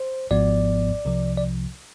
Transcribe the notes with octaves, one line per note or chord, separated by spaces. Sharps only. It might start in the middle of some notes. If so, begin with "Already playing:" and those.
Already playing: C5
G#1 G#2 F3 B3 D5
C2 C3 F3
D5